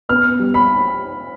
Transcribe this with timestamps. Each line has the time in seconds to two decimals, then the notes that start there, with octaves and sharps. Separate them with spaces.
0.09 B3 F6
0.39 G3
0.54 B5